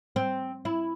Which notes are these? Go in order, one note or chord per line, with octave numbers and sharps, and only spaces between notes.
C4
E4